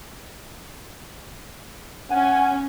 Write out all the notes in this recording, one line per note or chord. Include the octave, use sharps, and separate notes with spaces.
C#4 F#5 G#5